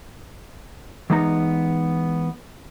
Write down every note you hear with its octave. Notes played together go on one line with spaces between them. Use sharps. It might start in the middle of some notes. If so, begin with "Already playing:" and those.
E3 G#3 B3 D#4 A#5